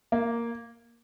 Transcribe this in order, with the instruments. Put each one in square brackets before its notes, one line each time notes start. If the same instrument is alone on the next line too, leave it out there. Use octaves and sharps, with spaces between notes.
[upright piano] A#3